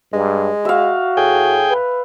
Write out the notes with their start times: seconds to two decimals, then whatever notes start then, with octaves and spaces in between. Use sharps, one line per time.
0.13 G2 G#3
0.65 F#4 E5 F5
1.17 A2 G#4 G5
1.70 B4